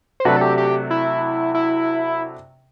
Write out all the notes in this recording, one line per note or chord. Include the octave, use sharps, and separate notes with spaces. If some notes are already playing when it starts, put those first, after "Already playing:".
C5
C3 F#3 A3 D4 F#4 B4
A4
G4
G4
E4
E4